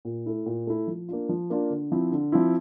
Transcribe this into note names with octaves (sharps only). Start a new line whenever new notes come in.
A#2
A3 E4
A#2
A3 E4
F3
A#3 D4 F4
F3
A#3 D4 F4
D3
F3 C4 E4
D3
F3 C4 E4